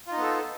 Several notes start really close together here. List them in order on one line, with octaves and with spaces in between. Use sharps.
F4 D#4 B3 A4